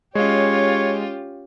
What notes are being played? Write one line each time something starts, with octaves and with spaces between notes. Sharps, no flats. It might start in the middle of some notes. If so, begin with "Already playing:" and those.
G#3 C#4 F4 G4 C#5